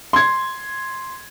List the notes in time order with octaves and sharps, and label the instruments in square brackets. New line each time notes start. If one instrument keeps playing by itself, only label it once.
[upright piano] C6 G#6